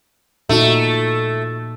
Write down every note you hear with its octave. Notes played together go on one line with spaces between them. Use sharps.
A#2 A3 D#4 F#4